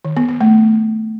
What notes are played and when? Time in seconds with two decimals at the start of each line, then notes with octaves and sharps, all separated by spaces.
0.05 D#3
0.17 B3
0.29 B3
0.41 A3